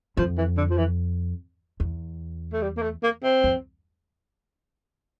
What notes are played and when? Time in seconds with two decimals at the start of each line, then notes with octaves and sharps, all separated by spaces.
0.17 F2 F3
0.37 E3
0.57 D3
0.70 F3
0.78 E3
1.80 E2
2.53 A3
2.62 G3
2.77 A#3
2.82 A3
3.03 A#3
3.23 C4
3.44 F2